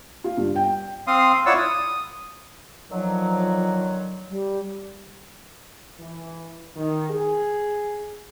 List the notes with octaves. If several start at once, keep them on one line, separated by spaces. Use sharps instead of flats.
F4
G2
G5
C4 F5 C6 D#6
E4 F4 C#5 D5 F#5 E6
D#6
D3 D#3 F3 F#3
G3
E3
D#3
G#4